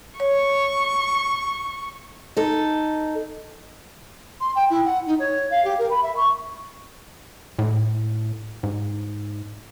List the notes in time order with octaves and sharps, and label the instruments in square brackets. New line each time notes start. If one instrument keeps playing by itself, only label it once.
[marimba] C#5 [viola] C#6
[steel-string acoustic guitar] D#4 A4
[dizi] C6
G5
E4
F#5
D#4
C#5
F5
G4
A#4
B5
E5
C#6
[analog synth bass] A2
G#2